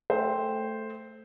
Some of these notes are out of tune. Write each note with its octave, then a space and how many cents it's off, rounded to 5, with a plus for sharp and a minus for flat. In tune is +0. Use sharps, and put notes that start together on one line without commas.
A3 +0 C5 +0 G5 +0